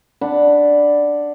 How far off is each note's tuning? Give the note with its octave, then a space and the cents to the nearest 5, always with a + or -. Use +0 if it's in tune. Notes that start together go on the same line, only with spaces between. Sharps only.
D4 +0 F#5 +0 B5 +0